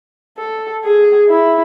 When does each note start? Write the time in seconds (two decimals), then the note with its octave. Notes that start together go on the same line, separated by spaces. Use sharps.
0.38 A4
0.84 G#4
1.29 E4